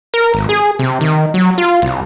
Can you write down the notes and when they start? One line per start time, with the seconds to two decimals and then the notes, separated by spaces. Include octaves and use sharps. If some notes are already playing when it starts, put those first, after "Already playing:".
0.14 A#4
0.34 G#1
0.49 G#4
0.79 C3
1.01 D#3
1.34 F#3
1.58 F4
1.82 C2